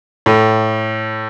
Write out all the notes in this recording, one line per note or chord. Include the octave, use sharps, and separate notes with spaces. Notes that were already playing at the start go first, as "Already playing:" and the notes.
A2